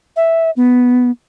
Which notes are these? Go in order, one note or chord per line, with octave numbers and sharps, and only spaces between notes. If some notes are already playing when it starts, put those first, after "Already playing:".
E5
B3